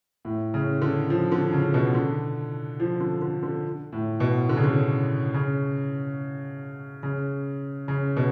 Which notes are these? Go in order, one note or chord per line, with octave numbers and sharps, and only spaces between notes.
A2
C#3
D3
F3
D3
C#3
B2
D3
F3
D3
D3
D3
A2
B2
D3
C#3
D3
C#3
C#3
C#3
B2